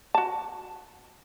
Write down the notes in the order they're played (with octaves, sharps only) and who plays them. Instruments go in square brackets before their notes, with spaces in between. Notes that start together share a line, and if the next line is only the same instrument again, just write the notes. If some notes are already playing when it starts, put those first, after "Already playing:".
[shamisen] F#4 A5